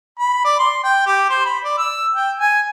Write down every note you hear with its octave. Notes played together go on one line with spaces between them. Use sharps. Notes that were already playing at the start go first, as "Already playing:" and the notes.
B5
D5
C6
G5
G4
C5
B5
D5
E6
G5
G#5